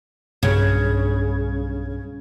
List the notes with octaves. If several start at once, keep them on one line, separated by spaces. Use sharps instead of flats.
B1 G2 C#3 G#6